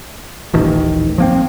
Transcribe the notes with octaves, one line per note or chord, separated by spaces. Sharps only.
D#1 A1 D#3
F3 A#3 C4